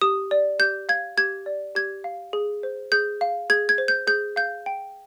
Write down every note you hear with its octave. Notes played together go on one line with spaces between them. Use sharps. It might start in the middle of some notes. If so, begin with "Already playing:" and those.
G4 D#6
D5
G4 G6
F5 G#6
G4 G#6
D5
G4 G#6
F5
G#4
C5
G#4 G6
F5
G#4 G#6
G#6
C5
G6
G#4 G6
F5 G6
G5